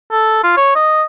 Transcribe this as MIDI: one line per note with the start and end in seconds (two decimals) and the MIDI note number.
0.12 0.42 69
0.43 0.54 65
0.57 0.72 73
0.75 1.03 75